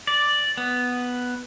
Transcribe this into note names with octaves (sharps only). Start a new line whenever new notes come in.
D5
B3